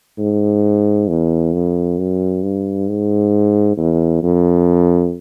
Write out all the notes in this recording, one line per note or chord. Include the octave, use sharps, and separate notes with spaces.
G#2
E2
F2
F#2
G2
G#2
E2
F2